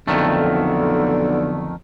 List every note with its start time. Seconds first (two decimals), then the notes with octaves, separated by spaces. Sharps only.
0.08 B1 F2 D3 D#3 A3